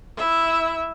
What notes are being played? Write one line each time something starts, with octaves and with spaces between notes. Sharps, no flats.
E4 E5